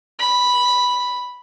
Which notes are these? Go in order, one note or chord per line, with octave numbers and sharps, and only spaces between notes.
B5